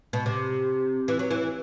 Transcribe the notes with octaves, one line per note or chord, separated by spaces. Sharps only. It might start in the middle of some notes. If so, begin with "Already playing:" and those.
B2
C3
E3
F#3
E3